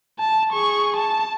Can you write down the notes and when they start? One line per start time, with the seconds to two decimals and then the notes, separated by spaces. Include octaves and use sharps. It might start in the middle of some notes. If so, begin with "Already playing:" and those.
0.19 A5
0.53 G#4 C#6
0.97 A5